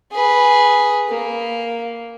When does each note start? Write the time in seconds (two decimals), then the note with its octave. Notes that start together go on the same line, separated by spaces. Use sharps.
0.12 G#4 B4
1.08 A#3